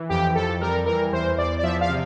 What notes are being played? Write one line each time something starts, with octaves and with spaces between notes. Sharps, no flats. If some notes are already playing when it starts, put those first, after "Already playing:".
Already playing: E3
F2 G4
F2 A4
G3 A#4
E3 A#4
E2 C5
E2 D5
D5
F3 E5
F5
C3